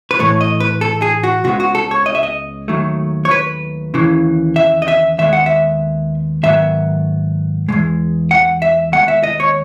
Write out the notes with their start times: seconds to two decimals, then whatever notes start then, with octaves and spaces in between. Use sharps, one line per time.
0.11 B4
0.19 A2 E3 A3 C#5
0.41 D#5
0.60 B4
0.81 A4
1.02 G#4
1.23 F#4
1.44 C#2 C#3 G#3 B3 F#4
1.60 F#4
1.75 A4
1.91 C#5
2.06 D#5
2.15 E5
2.23 D#5
2.68 D#2 D#3 F#3 A3
3.25 C#5
3.31 B4
3.94 D#2 C#3 E3
4.56 E5
4.82 D#5
4.88 E5
5.18 D#2 D#3 G#3 B3 E5
5.33 F#5
5.46 E5
6.43 G#2 D#3 F#3 B3 E5
7.69 E2 B2 G#3
8.31 F#5
8.62 E5
8.92 D#2 D#3 G#3 B3 F#5
9.08 E5
9.23 D#5
9.40 C#5